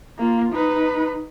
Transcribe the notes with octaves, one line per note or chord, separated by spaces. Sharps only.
A#3 F4
D#4 B4